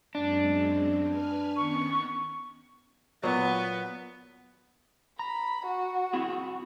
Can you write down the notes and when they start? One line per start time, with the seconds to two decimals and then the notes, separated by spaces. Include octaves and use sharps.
0.15 F#2 G#3 C4 D4
1.07 B4 G#5 F6
1.56 D#3 B3 C#4 C#6
3.23 A#2 F#3 B3
5.19 A#5 B5
5.67 F#4
6.13 C4 E4 G#4